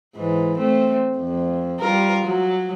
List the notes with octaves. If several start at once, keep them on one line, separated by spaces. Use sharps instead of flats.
G#2 E3
A3 C4
F2
G3 F4 A#4
F#3